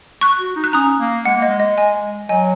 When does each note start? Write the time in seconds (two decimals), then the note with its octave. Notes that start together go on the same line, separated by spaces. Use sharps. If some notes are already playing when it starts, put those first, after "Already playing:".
0.21 C#6 F#6
0.39 F#4
0.56 D#4
0.64 F#6
0.73 C#4 A#5 D#6
0.99 A#3
1.25 G#3 F#5
1.37 A#3
1.42 D#5
1.48 G#3
1.60 D#5
1.78 D#5 G#5
2.29 F#3 D#5 G#5